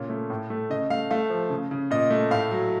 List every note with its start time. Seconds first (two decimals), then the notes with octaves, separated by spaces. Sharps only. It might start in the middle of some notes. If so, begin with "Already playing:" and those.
Already playing: A#2 C#3 C#5
0.09 A3
0.30 A2
0.50 A3
0.70 C#3 D#5
0.90 A3 F5
1.11 A3 F5
1.30 F3
1.50 C#3
1.71 C#3
1.91 A#2 D#5
2.10 A3
2.31 A2 F5
2.51 F#3